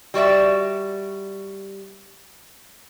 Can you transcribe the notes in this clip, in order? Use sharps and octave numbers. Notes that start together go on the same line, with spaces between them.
G3 F#4 D5 E5